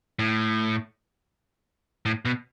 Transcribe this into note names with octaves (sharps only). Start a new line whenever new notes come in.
A2
A2
B2